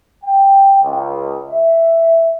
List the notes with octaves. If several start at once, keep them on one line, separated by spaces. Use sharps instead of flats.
G5
C#2
E5